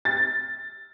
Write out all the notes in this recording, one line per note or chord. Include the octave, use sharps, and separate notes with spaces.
A6